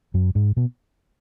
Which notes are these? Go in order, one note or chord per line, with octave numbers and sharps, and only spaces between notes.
F#2 F#3
G#2 G#3
B2 B3